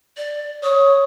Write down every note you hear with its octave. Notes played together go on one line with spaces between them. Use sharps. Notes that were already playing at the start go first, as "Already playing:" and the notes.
D5
C#5 D#6